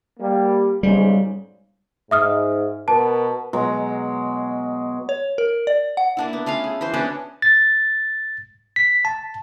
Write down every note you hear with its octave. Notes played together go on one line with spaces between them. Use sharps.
G3 A#3
B1 G#2 C#3 G3
G#2 E5 D#6 F6
B2 A#4 B4 A5
B2 F#3 G#3 A#5
C#5
A#4
D5
F#5
A#3 D4 E4
B3
A3 C#4 F4 F5
G#4
E3 B4 C5
B3 C#4 D4 F#4
A6
B6
A5